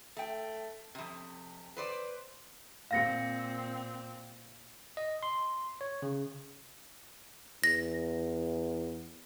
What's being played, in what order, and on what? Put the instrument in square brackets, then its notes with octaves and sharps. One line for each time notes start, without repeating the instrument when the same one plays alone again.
[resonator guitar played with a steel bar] A3 G5
F2 C3
B4 C5 D5
[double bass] A#2 C4 [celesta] F5 A#6 C#7
[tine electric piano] D#5
C6
C#5
C#3
[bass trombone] E2 [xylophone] A#6